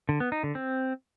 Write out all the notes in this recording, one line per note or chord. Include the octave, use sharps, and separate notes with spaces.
D3
B3
D#4
D3
C4